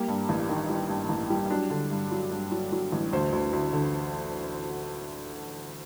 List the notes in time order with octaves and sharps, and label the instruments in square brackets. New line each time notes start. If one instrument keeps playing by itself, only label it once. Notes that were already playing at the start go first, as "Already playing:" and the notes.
Already playing: [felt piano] G3 A#3
G2
A1
D#3
G3
G2
A1
G3
F#3 D4
D3
G2
F#3
G2
F#3
F#3
A1
D2 C5
D2
D2
D3